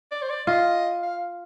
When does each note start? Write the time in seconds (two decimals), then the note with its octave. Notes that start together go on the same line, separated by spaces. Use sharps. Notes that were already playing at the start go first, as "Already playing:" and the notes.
0.11 D5
0.22 C5
0.30 D5
0.47 F4 D#5
1.03 F5